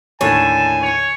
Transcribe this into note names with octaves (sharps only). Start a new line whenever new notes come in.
D#2 A2 D3 C#5 G#5 A5
C#5